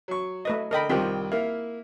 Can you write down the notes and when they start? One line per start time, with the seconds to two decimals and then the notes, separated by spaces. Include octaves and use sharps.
0.08 F#3 C#6
0.45 A3 B4 D#5
0.71 D3 A#4 D#5 G5 B5
0.89 C2 D#3 C4 F4 G4 G5
1.32 A#3 E4 F5